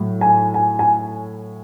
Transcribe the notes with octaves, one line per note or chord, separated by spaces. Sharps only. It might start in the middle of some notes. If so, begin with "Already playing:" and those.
Already playing: A2 F#3
G#5
G#5
G#5